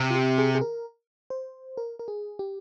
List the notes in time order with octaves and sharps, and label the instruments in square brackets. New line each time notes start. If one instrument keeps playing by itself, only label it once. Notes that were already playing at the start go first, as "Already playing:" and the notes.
Already playing: [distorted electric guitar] C3
[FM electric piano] F4
G4
G#4
G#4
A#4
C5
A#4
A#4
G#4
G4